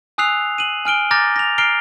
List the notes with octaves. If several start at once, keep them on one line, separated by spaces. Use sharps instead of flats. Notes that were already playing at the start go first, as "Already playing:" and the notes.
G#5 D#6 E6 F#6 C7 F7
D#7 F#7
G#5 F6 D7 G7
A#5 D6 F6 G6 A6 A#6
A#6 F7
A#5 F6 C7 D7 G7